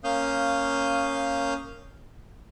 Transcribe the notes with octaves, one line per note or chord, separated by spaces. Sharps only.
A#3 C#4 F5 D#6 F6 G6